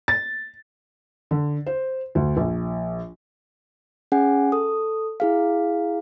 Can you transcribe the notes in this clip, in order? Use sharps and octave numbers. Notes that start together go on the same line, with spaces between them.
A6
D3
C5
D2
A#1
C#4 G#4 F#5 G#5
A4 D#6
E4 G#4 F5